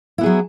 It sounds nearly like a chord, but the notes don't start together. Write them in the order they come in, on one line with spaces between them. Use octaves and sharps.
E4 B3 G#4 F#3